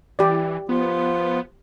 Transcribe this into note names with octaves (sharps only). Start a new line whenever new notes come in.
E3 G4 D5
F3 B3 F4